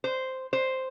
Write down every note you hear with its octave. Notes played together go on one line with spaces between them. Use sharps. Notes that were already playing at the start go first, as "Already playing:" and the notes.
C5
C5